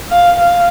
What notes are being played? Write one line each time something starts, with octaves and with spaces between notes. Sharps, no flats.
F5
F5